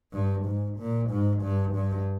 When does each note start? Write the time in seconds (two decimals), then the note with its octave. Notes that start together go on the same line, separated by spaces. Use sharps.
0.13 G2
0.46 G#2
0.78 A#2
1.10 G#2
1.42 G2
1.74 G2